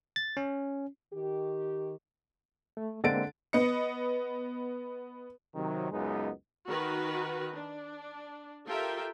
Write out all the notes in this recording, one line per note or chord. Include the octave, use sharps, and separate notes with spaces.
A6
C#4
D#3 G4
A3
D3 G#3 A#3 C4 A6 D7
B3 D#5 C#7
C3 D#3 F#3
C#2 F#2 G#3 B3 D#4 B4
D#3 F#4 A#4 B4
D4
F4 G4 A4 A#4 E5 G5